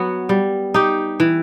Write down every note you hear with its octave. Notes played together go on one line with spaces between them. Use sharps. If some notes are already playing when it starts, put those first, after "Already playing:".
Already playing: F#3 B3 F#4
G3
D#4 G4
E3